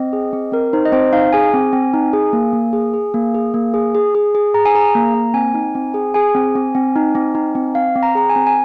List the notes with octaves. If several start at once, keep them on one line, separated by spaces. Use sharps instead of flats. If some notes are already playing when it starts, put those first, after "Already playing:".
Already playing: C4 D#5
G#4
C4
C4 A#4
D#4 C5
D#5
C4 C5
D#4 F5
G#4 G#5
C4
C4
D#4
G#4
A#3
A#3
G#4
G#4
A#3
G#4
A#3
G#4
G#4
G#4
G#4
G#4 A#5
G#5
G#4 A#5
A#3
A#3
C4 G#5
D#4
C4
G#4
G#4 G#5
C4
C4
C4
D#4
C4
D#4
C4
C4 F5
C4
A#5
G#4 A#5
G#5
C4
G#5